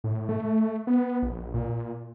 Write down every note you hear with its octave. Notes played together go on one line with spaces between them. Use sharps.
A2
A3
B3
A#1
A#2